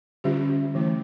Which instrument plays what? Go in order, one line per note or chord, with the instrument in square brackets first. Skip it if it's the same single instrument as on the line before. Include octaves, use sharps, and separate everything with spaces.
[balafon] D3 G3 C#4 F4 G4
E3 A3 E4